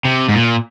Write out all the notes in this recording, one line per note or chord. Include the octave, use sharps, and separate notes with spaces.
C3
G#2
A#2